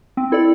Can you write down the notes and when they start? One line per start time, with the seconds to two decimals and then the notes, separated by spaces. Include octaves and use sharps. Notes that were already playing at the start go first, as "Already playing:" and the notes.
0.17 C4
0.32 E4 A4 D5